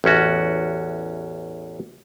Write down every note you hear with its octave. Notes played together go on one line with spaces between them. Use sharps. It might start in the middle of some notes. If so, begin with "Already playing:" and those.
A1 E2 C#4 F#4